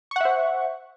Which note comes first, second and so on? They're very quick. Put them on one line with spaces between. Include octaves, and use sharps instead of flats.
C#6 F#5 E5 C5